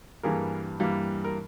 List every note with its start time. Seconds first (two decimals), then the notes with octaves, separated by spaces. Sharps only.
0.23 G2 E3 G3 A#3 G#4 A#4
0.80 G2 E3 G3 A#3
1.24 A#4